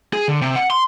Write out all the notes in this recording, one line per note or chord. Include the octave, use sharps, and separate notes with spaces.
G#4
D3
C3
F#5
C6